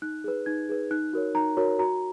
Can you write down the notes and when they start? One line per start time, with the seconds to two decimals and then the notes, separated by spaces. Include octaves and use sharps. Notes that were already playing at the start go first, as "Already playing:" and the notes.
0.02 D#4 F#6
0.24 G#4 B4
0.46 D#4 G#6
0.69 G#4 B4
0.91 D#4 F#6
1.13 F#4 A#4 C#5
1.34 D#4 A#5
1.57 F#4 A#4 C#5
1.79 F#4 A#5